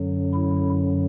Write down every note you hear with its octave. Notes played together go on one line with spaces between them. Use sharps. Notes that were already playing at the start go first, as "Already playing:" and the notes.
Already playing: F#2 D3 F#3
E4